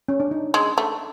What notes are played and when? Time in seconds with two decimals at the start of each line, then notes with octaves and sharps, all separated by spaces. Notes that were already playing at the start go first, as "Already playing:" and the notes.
0.09 C#4
0.20 D4
0.31 D#4
0.54 G#3
0.78 A3